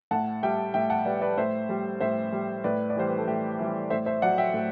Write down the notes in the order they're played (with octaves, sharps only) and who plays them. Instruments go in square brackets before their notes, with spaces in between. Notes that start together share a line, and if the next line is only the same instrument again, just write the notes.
[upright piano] A2 F#5 A5
G3 E5 G5
A2 E5 G5
F#5 A5
G3 B4 D5
B4 D5
A2 C5 E5
G3
A2 C5 E5
G3
A2 B4 D5
D5
E3 G3 C5
B4
A4
A2 G4
E3 G3
A2 C5 E5
C5 E5
F#3 D5 F#5
E5 G5
A2